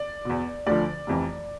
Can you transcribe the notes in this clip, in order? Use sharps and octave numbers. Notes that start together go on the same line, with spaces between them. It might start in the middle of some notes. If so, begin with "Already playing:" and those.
Already playing: D5
E2 B2
D2 D3 F3 D5
F1 F2 E3